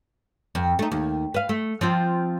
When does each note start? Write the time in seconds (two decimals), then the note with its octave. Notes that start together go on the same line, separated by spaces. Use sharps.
0.55 F2
0.79 A3 D#4
0.92 D#2
1.34 B4 F5
1.49 A3
1.81 F3 C4 F4